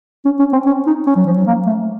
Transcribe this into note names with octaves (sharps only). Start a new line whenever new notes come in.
C#4
C#4
C4
C#4
D#4
C#4
F#3
F3
F#3
A#3
A3